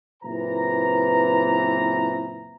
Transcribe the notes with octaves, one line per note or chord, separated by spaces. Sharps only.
F#1 A#2 E3 C4 B4 A#5